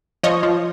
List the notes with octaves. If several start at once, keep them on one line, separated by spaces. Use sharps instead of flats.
F3 C#5 D#5
F3